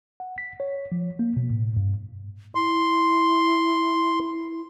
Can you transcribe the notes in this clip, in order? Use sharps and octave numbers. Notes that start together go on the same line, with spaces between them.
F#5
B6
C#5
F3
A#3
B2
A2
G2
E4 C6